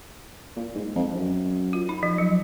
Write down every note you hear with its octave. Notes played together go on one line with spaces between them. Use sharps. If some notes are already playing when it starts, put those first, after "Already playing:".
A#2
G#2
F2
F#2
F4
D#4
F3
F#3